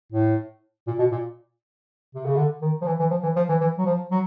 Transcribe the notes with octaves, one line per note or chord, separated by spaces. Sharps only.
A2
A#2
B2
A#2
C3
C#3
D3
D#3
F3
E3
E3
F3
E3
F3
E3
E3
F#3
F3
F#3